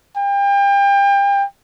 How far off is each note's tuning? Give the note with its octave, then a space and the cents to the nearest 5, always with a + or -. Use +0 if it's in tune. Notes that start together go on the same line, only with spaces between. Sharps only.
G5 +35